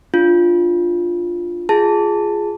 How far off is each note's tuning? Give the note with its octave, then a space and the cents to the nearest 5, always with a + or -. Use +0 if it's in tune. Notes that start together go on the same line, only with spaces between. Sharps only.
D4 +0 F4 +0
F4 +0 G#4 +0 A5 +10